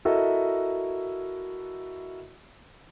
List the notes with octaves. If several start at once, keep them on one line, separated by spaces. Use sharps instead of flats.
E4 F#4 A4 A#4 D#5 E5